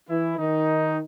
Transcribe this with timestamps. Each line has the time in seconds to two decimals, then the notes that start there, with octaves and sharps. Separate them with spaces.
0.09 E3 E4
0.38 D#3 D#4